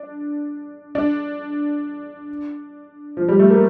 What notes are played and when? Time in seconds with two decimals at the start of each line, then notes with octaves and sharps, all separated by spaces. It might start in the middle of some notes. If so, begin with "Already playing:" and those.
Already playing: D4
0.95 D4
3.17 F3
3.29 G3
3.39 A3
3.50 A#3